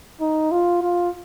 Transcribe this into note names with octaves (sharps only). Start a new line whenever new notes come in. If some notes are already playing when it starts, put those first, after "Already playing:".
D#4
F4
F4